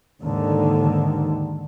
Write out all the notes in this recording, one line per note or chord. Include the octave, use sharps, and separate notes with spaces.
D#2 G#2 D3 D#3